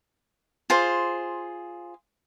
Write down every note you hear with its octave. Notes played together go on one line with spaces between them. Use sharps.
F4 G#4 C5